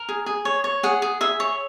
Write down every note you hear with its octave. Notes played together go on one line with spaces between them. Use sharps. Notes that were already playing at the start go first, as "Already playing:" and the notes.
Already playing: A#4
G#4
G#4
C#5
C#5
G#4 F#5
G#4
G#4 E5
C#5